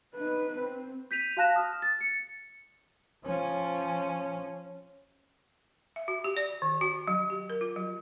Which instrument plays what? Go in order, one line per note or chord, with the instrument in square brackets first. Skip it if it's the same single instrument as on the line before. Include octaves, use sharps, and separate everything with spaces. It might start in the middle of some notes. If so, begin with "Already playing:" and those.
[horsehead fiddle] D#4 B4
C4
[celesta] G6 B6 D#7 F7
F#4 F5 A5 F#6 A#6 E7
D#6 F6
A6
C#7
[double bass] F3 C#4
[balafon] E5
F#4
G4
D5
D#3
F#4
F#3
G4
A#4
F4
F#3